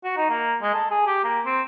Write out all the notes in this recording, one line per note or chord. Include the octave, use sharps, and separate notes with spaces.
F#4
D#4
A#3
G#3
A4
G#4
G4
A#3
C4